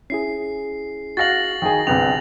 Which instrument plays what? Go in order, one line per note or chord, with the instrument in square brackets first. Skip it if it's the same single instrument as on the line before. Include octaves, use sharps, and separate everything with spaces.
[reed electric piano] C#4 E4 G#4 [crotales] C7
[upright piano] F#4 F5 [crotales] A6 A#6 F#7
[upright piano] D#3 G#4
[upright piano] G1 C2 C3 [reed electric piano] G#4 B4 G5 [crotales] F7